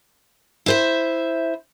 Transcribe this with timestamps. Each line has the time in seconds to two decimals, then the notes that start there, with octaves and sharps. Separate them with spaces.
0.66 E4 C5 E5